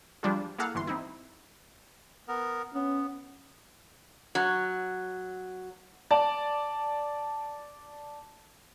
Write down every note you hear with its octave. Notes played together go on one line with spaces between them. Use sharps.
F3 G3 D4 F4 G#4
A#3 E4 G#4 A4 F5 F#5
G1 E3 C6
C4 D#4 E4
B3 A#4
B3 C#4
F#3
D5 A5